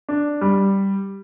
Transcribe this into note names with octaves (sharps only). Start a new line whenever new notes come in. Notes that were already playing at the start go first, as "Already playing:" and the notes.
D4
G3